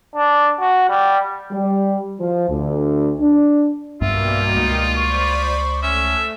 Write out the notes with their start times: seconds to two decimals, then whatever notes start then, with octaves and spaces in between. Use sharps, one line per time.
0.15 D4
0.60 F#4
0.89 G3
1.51 G3
2.20 F3
2.49 D2
3.19 D4
4.01 B1 G2 B2 G3 A#3 B3 F4 E5
4.55 C#2 G#3 D#4
4.97 C5 D5 B5 C#6
5.83 A3 C#4 E5